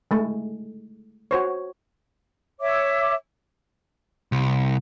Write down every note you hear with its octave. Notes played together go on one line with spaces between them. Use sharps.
G#3 A3
F#4 C5 C#5
C#5 E5 D6
C2